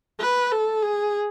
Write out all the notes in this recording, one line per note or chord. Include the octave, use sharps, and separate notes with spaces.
B4
A4
G#4